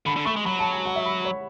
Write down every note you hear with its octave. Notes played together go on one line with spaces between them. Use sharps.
D3 B5
D3
A3 C#6
G#3
F#3 B5
A5
G#5
F#5
E5
B5
C#5